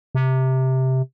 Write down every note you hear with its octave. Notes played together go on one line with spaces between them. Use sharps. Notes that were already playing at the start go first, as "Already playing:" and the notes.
C3